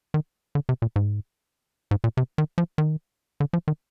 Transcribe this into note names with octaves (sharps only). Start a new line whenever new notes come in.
D#3
D3
C3
A#2
G#2
G#2
A#2
C3
D#3
F3
D#3
D3
F3
D#3